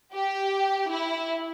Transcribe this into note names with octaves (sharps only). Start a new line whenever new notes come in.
G4
E4